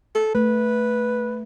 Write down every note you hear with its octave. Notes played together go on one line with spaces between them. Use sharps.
A4
A3 B4